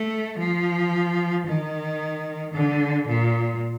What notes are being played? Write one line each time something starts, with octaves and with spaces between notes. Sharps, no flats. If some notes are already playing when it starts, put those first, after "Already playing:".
Already playing: A3
F3
D#3
D3
A#2